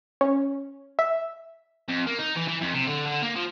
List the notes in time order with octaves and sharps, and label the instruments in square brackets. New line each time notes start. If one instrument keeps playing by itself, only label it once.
[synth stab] C#4
E5
[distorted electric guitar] F2
A#3
D#4
E3
E3
F2
C3
D3
D3
A#3
F3